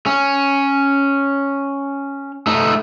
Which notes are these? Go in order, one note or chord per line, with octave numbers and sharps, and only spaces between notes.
C#4
A3 D#4